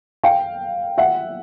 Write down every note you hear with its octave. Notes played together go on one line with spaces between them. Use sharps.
F5 G5
E5 F#5